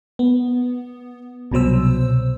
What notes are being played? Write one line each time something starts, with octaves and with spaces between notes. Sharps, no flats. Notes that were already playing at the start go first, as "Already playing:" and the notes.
B3
C2 B2 F#3 C5 E6